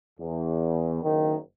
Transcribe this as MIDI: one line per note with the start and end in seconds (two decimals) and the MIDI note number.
0.19 1.00 40
1.03 1.36 30
1.03 1.36 51